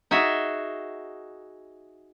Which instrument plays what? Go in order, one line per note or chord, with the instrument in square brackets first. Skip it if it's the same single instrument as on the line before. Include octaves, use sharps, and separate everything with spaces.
[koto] D#4 F#4 G#4 E5